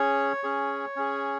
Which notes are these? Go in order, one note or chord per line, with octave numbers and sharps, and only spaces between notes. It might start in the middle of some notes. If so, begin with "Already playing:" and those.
Already playing: C#4 G#4 C#5
C#4 G#4
C#4 G#4